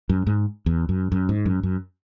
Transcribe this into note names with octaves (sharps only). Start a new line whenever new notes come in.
F#2
G#2
E2
F#2
F#2
G#2
F#2
F#2